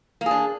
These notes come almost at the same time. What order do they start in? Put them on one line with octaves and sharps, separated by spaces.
A#3 G#4 D4